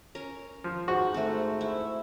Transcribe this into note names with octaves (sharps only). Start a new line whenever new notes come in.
C#4 A#4
F3
G#2 F#4
A3 C4
E4